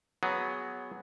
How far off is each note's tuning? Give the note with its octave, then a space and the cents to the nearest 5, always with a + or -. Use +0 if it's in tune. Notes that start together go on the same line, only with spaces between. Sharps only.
F#3 +0 B3 +0 G#4 +0